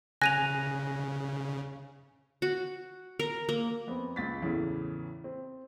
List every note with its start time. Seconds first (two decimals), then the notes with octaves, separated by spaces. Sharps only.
0.22 C#3 G#5 F#6 A#6 D#7 F7
2.42 F#4
3.19 A#4
3.49 A#3
3.87 F2 B3 C4
4.16 C#2 A6 B6
4.42 E2 A2 C#3 E3
5.24 C4